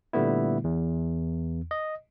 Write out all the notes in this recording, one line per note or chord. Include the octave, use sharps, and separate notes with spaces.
A#2 D3 G3 A3 B3 E4
E2
D#5